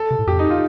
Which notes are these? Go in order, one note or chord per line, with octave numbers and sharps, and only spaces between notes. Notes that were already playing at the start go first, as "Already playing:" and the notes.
Already playing: A4
C3
A2
F2 G4
D#4
F4